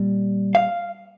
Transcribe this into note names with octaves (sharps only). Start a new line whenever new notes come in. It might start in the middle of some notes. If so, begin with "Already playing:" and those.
Already playing: A#2 G3
F5